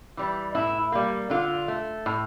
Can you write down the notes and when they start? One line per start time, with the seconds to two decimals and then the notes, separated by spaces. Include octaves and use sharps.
0.17 E3 G3
0.55 A2 E4
0.92 G3 A#3
1.30 D3 F4
1.68 A3
2.06 A2